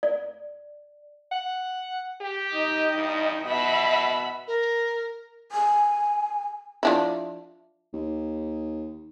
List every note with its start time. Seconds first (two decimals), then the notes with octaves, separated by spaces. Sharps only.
0.03 D5
1.32 F#5
2.21 G4
2.53 D#4 D#5 G5
2.94 G2
3.45 B2 E5 F#5 B5
4.48 A#4
5.52 G#5
6.83 F3 D4 E4
7.94 D#2